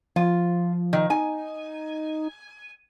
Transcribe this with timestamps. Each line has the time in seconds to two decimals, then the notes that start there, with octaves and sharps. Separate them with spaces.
0.16 F3 F4
0.93 D#3
1.10 D#4 G#5